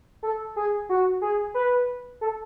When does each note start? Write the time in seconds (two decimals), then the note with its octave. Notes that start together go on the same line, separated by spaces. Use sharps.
0.23 A4
0.56 G#4
0.89 F#4
1.22 G#4
1.54 B4
2.21 A4